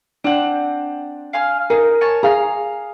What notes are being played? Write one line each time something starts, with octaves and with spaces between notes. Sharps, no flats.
C4 D4 F#5
F5 G#5 F6
D#4 G#4 A#4
C#5 G#5 A5
G#4 F5 A#5 F6